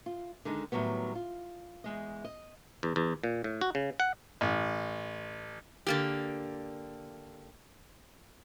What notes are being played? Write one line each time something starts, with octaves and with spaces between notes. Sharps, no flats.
F4
D3 D#3 G#3 D4 D#4
A2 D#3 F#3 G3 B3
F4
E2 G#3 D#5
D#5
E2
E2
A#2
A2
F#4
C#3
F#5
A1
D3 A#3 G4